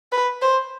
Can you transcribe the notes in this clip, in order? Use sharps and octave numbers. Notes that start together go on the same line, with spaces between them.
B4
C5